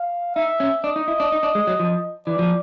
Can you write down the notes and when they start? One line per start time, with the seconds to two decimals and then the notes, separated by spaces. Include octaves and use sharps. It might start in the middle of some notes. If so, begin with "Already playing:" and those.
Already playing: F5
0.35 D#4 E5
0.60 C#4
0.84 D4 D#5
0.96 D#4
1.08 E4
1.20 D4
1.32 D#4
1.43 D4
1.55 G#3
1.67 F#3
1.80 F3
2.27 E3 D5
2.39 F3